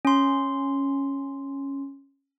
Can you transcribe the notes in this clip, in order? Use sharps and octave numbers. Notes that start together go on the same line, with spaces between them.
C#4 C6